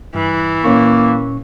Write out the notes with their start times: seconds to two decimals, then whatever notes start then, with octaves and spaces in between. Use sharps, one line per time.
0.15 G2 E3
0.64 A#2 A#3 C#4 C#6